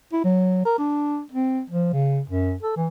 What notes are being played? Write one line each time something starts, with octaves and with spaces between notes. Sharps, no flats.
E4
F#3
A#4
D4
C4
F3
C#3
F#2
A4
E3